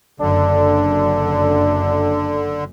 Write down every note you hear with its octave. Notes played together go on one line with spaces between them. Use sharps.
F#1 F#2 D3 D4